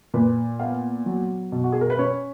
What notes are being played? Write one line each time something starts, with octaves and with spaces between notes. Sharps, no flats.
A#2 B4
B3 F5
F#3
B2
F#4
G#4
A#4
B4
C#4 C#5